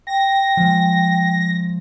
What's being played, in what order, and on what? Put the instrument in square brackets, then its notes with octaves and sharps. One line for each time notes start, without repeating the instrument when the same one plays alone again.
[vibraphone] G5 [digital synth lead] A#6
[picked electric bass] F3 G#3